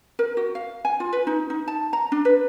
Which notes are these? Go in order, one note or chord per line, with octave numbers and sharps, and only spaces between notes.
A#4
F#4
F5
G#5
F4
B4
D#4
D#4
A5
A#5
D4
B4